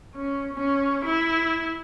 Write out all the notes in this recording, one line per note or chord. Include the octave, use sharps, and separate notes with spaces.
C#4
C#4
E4